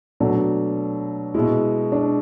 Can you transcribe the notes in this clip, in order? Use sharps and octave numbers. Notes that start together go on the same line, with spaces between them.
B2 F#3 A3 D4
B2 G#3 E4
D4